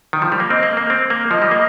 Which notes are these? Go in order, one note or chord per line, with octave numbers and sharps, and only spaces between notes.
D#3
F3
G3
A#3
C4 D#5
A#3
A#3
C4
A#3
F3 D#5
G3
A#3